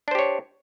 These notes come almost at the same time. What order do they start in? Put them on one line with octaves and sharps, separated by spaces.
D4 C5 G4 C#5